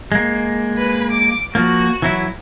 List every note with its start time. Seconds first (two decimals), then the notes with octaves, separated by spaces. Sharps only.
0.12 G#3 A#3
0.77 B4
1.11 D6
1.55 F3 A#3 F#4
2.02 E3 F#3 E4